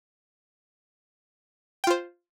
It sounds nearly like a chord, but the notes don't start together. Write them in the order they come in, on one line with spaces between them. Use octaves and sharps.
G5 F4 C5